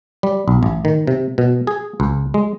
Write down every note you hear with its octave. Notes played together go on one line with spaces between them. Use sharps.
G3
B1
A1
D#3
C3
B2
G#4
C#2
G#3